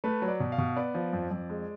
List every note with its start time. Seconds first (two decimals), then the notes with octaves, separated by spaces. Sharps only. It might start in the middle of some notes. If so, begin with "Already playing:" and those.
0.04 A3 B4
0.22 F#3
0.28 D5
0.40 B2
0.52 F5
0.58 B2
0.76 B3 D5
0.95 F3
1.13 F2
1.31 F2
1.50 G#3